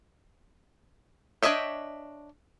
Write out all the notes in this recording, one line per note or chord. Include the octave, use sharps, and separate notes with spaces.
D4 C#5 D#5 E5 G5